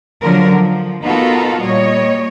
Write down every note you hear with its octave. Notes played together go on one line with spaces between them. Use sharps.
D3 F3 F#3 A#4
F3
B3 D#4 F4 F#4 A4 A#4
A#2 G3 C#5 D#5